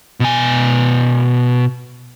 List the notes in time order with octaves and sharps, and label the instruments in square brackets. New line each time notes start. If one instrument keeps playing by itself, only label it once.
[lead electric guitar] B2 G#5